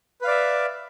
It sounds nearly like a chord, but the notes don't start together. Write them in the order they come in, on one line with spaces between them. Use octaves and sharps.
B4 F5 D5 E5